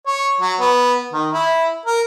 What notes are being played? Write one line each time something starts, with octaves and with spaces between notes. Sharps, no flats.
C#5
F#3
B3
D#3
E4
A#4